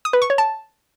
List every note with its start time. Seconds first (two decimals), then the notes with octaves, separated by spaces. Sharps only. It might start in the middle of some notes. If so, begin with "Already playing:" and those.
0.05 D#6
0.13 B4
0.22 C#6
0.30 C#5
0.38 A5